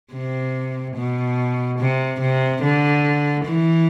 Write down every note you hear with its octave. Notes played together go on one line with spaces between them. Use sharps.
C3
B2
C3
C3
D3
E3